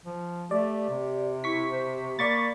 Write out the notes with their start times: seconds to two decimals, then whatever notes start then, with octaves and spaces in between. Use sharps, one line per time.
0.05 F3
0.51 A3 G4 D5
0.90 C3
1.44 E4 C#6 B6
1.71 C5
2.19 A#3 D5 B5 C#6 A6